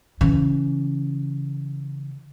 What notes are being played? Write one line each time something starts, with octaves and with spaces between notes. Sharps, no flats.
C#3 E3